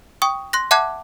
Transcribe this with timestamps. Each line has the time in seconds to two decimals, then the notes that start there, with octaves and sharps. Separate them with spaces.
0.22 G5 C#6 D#6
0.53 C6 F#6 A#6
0.71 E5 F#5 A5 D6 F#6 G#6